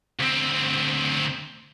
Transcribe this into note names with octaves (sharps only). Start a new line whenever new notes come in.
D2 C4